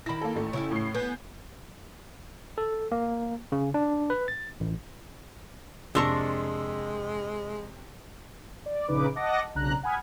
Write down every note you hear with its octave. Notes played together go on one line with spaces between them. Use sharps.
D#3 E4 B5 A#6
A#3 A4
A1 A3
C#3 E4 G4
A2 C7
B3 G#5 G6
A4
A#3
C#3
D4
B4
A6
A1
F2 C3 G#3 D4 A#4 C6 C#6 E6
D5
A#1 C#3 D#4 B4 D6
D#5 F#5 A5 D6 A#6
B1 C#3 D4 A#5 F#6
F#5 G#5 B5 D#6 F6 G#6